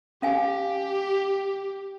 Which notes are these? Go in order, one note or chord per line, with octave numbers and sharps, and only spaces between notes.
C#4 G4 F5 G#5